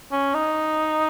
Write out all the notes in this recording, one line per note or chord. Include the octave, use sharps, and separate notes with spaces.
C#4
D#4